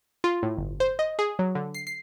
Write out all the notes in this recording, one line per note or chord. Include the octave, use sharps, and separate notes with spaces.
F4
A2
G1
C5
D#5
G#4
F#3
D3
C7
C7